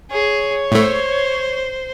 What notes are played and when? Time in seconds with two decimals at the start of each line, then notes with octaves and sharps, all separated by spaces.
0.10 G#4 C#5
0.72 A2 A3 C5